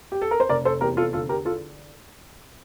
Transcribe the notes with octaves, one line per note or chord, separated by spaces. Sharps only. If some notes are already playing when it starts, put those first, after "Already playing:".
G4
A4
A#4
C5
F1 A#4 D5
A4 C5
E2 G4 A#4
F4 A4
D3 F4 A4
G4 A#4
F4 A4